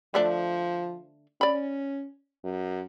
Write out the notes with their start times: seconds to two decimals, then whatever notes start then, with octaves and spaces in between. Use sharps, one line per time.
0.14 D3 F3 A3 D4
1.41 C#4 D5 B5
2.43 F#2